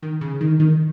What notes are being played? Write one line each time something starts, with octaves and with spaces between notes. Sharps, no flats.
D#3
C#3
D#3
D#3